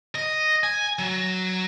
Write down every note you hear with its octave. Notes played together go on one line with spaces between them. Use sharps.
D#5
G#5
F#3